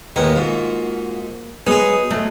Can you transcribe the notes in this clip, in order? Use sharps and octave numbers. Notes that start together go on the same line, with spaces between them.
D#2 A2 E3 G#3 A#3 B3
G#2 F4 F#4
F#3 G#3 B3 D#4 G#4
F#3 G#3 A3